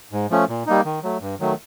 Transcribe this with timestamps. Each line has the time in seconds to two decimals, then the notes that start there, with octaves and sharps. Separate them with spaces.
0.12 G#2
0.30 F3 A3 C#4
0.49 A#2
0.66 G3 A#3 D#4
0.85 D#3
1.03 F#3 A3
1.21 G2
1.40 D#3 F#3 A3